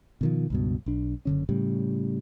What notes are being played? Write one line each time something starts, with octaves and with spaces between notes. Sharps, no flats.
B2 D#3 F3
C#2 G2 B2
B1 D4
F#1 D3 C#4
A2 C#3 G3